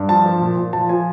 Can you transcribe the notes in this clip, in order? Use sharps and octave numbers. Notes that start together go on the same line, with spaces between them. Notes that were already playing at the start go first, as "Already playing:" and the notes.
Already playing: G2
F3 A5
F3
A#2
A#2
F3 A5
F3 G#5